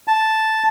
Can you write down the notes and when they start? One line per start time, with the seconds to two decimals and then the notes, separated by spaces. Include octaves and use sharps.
0.08 A5